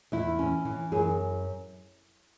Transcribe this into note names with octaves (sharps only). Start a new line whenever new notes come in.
E2 E4
C#4
E3
F#2 G#4